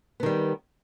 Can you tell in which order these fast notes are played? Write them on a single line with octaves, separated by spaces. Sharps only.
B3 D#3 G3